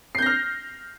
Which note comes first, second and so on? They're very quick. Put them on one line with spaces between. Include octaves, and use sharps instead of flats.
C7 G6 A#6 F6